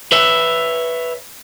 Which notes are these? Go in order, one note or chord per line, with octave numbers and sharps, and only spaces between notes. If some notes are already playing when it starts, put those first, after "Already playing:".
B4 C#5 E5